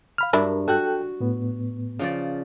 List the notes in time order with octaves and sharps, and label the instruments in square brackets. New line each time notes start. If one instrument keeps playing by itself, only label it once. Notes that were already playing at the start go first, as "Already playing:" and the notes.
[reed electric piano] F5 B5 F6
[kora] G2 [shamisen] F#3 D4 E4 [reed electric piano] A#4
[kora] F#4 [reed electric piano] A4 G5 F#6
[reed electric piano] A2 B3
[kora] C#3 F3 D5